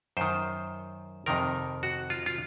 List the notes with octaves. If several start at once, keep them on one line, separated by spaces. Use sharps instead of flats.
F#2 D#3 C5
F2 C3 D#3 A#4
F#4
F4
F4